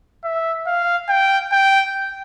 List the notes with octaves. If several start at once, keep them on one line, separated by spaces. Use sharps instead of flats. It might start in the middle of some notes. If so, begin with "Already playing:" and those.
E5
F5
G5
G5